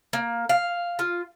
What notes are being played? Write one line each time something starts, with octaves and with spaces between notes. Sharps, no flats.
A#3
F5
F4